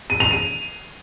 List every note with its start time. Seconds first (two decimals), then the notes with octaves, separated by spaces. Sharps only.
0.10 D#7
0.20 F7
0.31 D#7